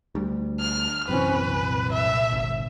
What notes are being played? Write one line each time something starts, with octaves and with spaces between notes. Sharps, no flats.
D2 G3
F6
F#2 C3 E3 C4 C#4 B4
C2 A#2
E5
G1